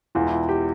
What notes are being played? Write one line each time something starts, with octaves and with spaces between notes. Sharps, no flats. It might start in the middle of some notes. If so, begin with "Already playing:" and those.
E1 E2 E3 F4
E4
F4
G4